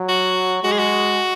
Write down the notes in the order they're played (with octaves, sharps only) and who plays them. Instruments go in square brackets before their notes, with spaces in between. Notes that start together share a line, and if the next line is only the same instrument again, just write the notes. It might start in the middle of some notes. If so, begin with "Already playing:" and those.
Already playing: [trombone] F#3
[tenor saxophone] F#4
[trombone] G#3 [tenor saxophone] F#4
[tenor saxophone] G#4
F#4